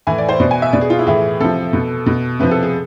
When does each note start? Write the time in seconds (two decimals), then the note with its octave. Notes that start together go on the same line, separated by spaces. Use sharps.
0.07 A2 E3 G#5
0.18 D5
0.29 C5
0.40 B2 D5
0.51 G#5
0.62 E5
0.73 B2 D5
0.81 G#4
0.90 F4
0.99 E4
1.07 A2 E3 G#4
1.40 C3 F3 A4
1.73 B2
2.06 B2
2.40 C3 F3 B4
2.51 A4
2.63 G#4